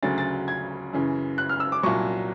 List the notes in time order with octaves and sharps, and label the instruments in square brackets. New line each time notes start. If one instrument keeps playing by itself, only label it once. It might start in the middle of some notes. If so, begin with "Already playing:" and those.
[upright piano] D2 C#3 F#3 A6
A6
G#6
F#2 C#3 E3
F#6
F6
E6
D6
C2 A#2 F#3 C#6